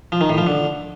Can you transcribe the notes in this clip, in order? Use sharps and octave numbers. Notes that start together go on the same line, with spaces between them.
F3
D#3
A2
F3
D3